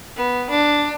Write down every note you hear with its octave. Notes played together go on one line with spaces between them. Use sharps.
B3
D4